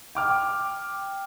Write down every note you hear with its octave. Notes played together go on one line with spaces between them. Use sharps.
G5 D6 F6